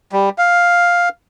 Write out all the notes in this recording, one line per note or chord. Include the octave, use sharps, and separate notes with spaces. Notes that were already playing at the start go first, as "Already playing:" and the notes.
G3
F5